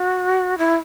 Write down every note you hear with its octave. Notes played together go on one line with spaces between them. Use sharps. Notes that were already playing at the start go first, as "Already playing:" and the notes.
Already playing: F#4
E4